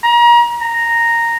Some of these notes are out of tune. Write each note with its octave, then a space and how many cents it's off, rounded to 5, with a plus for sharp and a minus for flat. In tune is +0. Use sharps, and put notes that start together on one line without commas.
A#5 +35
A#5 -5